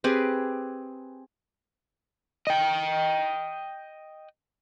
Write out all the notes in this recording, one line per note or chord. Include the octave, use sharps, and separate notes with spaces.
C4 G4 G#4 B4
D#5 G5